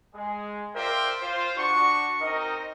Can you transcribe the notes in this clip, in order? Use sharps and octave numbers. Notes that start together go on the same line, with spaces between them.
G#3 G#4
F4 A#4 C5 D5 E5 G5
F4 C5
D4 F#4 C#6
C4 D#4 A#4 D#5